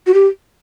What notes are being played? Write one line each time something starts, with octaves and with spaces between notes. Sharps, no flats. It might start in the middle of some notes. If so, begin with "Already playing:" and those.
F#4
G4